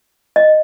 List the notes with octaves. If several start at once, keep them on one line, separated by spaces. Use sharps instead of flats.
D#5